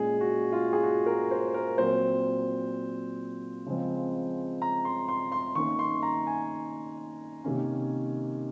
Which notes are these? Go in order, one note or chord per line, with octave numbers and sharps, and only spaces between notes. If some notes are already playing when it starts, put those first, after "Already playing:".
Already playing: A#2 G#3 C#4 G#4
F#4
F4
G#4
F#4
A#4
C5
A#4
A#2 F#3 C4 C5
C#3 F3 G#3 C4
A#5
C6
C6
C6
D#3 A#3 C#4 C#6
C6
A#5
G#5
C3 D#3 A#3 C#4